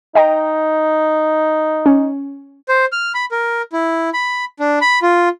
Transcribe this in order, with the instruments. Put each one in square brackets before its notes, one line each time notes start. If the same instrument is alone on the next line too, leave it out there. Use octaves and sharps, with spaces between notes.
[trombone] D#4 [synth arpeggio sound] D#5 G5 A#5
[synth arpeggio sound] C#4
[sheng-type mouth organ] C5
F6
B5
A#4
E4
B5
D4
B5
F4